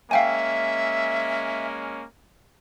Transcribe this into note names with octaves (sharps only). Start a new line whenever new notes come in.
G#3 A#3 C#4 E5 F5 G5 G#5